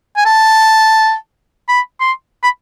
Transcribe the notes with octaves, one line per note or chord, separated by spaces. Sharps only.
G#5
A5
B5
C6
B5